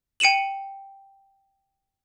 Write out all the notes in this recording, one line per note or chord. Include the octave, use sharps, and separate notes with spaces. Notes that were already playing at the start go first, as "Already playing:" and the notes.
G5 C#7 D#7 E7 F#7